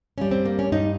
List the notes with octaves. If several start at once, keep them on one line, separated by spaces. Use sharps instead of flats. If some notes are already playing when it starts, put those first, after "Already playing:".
G2 G3 C#4
C4
A#3
C#4
G2 G3 D#4